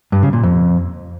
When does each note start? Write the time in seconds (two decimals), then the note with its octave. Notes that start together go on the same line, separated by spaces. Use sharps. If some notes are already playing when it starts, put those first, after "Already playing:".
0.12 G2
0.23 C#3
0.33 A#2
0.43 F2